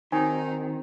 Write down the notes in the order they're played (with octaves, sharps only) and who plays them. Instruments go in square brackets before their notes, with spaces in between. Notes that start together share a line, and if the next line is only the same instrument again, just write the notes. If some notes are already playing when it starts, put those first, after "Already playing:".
[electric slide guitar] D#3 [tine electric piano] C4 F#4 [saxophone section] D#4 [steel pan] G#5